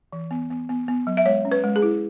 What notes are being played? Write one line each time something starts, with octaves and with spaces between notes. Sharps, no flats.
E3
B3
B3
B3
B3
F#3
E5
G#3 C#5
C#4
B4
G#3
G#4
E4